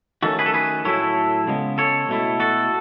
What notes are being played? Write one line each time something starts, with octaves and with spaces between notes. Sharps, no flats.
D#3 F#3 A3 C#4 F#4 A4
G#4 B4
A4
G#4 B4
A2 F#3 A3 E4 A4 C#5
C#3 G#3 B3
A4 C#5
B2 A3 E4
F#4 A4